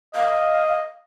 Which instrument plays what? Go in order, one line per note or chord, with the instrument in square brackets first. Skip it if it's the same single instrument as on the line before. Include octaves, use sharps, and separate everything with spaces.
[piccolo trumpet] D#5 [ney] F5